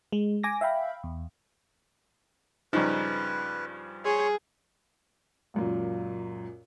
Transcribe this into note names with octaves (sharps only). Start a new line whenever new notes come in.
G#3
G#5 D6 A#6
E5 F5 G5 B5
E2
G2 C#3 F3 D#4 B4
G#4 C#5 C6
C#2 F#2 A#2